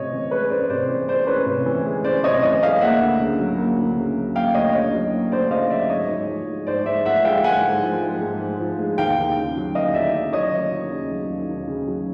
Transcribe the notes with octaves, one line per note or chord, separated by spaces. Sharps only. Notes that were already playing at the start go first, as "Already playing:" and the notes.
Already playing: C3 C#4 C#5 D#5
E3
G#3 B4 C#5
C#4 C5 D5
C3 C5 D5
E3
G#3 C5 D5
C#4 B4 C#5
C3
E3
G#3
C#4 C5 D5
C3 C#5 D#5
E3 C#5 D#5
G#3 D#5 F5
A#3 E5 F#5
D2
C#3
F#3
A#3
D2
C#3
F#3
A#3 F5 G5
D2 C#5 D#5
C#3 C#5 D#5
F#3
A#3
D2 C5 D5
C#3 D#5 F5
F#3 D5 E5
G#2 C#5 D#5
G#2
F3
G#3
G#2 C5 D5
G#2 D5 E5
F3 E5 F#5
G#3 F5 G5
G#2 F#5 G#5
G#2
F3
G#3
G#2
G#2
F3
G#3
D#2 F5 G5
D#2
C#3
F#3
D#2 D#5 F5
D#2 D5 E5
C#3
F#3 C#5 D#5
D#2
D#2
C#3
F#3
D#2
D#2
C#3
F#3